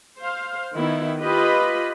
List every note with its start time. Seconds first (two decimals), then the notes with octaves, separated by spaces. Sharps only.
0.20 C5 F5
0.75 D#3 B3 E4
1.20 F4 G4 B4 D#5 B5